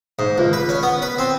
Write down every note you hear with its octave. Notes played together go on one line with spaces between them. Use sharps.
G#2
C#2
B4
C#4
B3
B4
C4